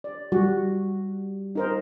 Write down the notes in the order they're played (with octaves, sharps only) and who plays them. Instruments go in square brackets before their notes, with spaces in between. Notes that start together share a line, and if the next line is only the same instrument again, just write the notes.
[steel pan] D5
[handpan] G3 [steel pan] F#4
[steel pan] D#4 A#4 C5